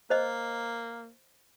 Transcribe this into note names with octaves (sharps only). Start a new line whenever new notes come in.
A#3 C5 D#5